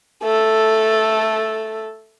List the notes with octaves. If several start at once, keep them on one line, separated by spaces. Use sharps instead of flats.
A3 A4